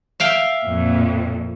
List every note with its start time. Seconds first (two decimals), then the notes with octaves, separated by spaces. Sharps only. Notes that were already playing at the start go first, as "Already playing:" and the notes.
0.20 E5 F5 G5
0.65 F2 A#2